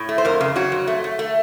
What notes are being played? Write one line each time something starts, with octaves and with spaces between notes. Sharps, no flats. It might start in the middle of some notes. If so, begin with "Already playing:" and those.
Already playing: A2
A3
C5
F2 A#4
C#3
F#3 F#4
F2
A3
A3
A3